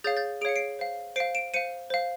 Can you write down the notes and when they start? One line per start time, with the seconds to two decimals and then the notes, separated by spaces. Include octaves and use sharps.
0.04 G#4 C#5 F5 G6 A6
0.17 G6 A6
0.41 G#4 D7
0.45 C#5 F5 C#7
0.56 C7 D7
0.79 C5 F5
1.16 C5 F5 C7 D7
1.35 D7 E7
1.54 C5 F5 C#7 D#7
1.90 C5 F5